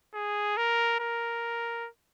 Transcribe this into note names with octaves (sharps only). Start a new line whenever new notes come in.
G#4
A#4
A#4